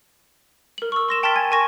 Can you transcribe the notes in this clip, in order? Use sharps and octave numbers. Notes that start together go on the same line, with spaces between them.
A#4 F#7
C#6 E6
C6 A#6 E7
G5 A5 C6 F6 A6 B6
G#5 G#6
A#4 G#5 C#6 A#6